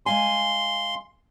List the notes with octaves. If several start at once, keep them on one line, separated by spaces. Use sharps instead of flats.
G#3 F5 G#5 C6